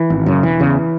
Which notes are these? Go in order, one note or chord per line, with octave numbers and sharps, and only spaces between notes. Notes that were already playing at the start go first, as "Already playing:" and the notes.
Already playing: E3
G#1
F#2 C#3
E1 E3
E2 C#3